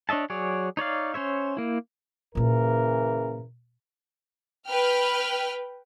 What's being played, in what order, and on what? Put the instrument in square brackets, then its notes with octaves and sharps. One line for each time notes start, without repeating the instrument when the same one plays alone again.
[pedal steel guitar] D4 C#5 D#5 E5 A5
F#3 G#4 C#5 D5
D#4 C#5 D5 F5
C#4 C5 C#5 E5
A#3 E4
[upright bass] A#2 A#3 [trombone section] C#3 E3 A#4
[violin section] B4 G5 F6